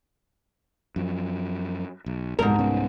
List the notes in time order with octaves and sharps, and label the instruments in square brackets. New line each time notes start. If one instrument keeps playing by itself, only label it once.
[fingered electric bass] F#2 F3
B1
[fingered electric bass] F1 C2 B2 [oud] G#2 A#4
[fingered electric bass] C2 B3 C#4